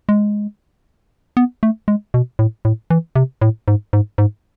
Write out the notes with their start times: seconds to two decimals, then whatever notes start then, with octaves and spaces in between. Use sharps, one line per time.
0.09 G#3
1.37 B3
1.63 A3
1.88 G#3
2.14 B2
2.39 A2
2.65 A2
2.90 E3
3.16 C3
3.42 A2
3.68 G#2
3.93 G#2
4.18 G#2